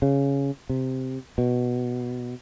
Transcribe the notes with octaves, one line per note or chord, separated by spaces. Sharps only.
C#3
C3
B2